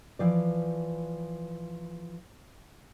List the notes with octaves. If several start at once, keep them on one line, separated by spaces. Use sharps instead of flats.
E3 F3 D5